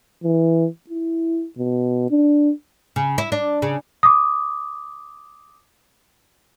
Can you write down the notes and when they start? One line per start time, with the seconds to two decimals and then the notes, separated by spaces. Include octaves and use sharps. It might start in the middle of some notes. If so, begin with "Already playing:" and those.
0.24 E3
0.90 E4
1.58 B2
2.11 D4
2.96 C#3
3.18 E4
3.32 D4
3.62 C#3
4.03 D6 D#6